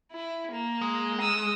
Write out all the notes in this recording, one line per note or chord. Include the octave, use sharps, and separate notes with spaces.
E4
A#3
G#3
D#6 E6